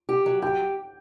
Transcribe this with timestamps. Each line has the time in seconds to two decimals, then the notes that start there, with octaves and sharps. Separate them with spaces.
0.09 G4
0.26 F#3
0.42 G4 G5